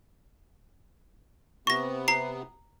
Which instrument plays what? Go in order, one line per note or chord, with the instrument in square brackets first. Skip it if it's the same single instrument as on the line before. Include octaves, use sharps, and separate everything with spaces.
[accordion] C3 B3 [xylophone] C#6 A#6
[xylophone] A#5 C7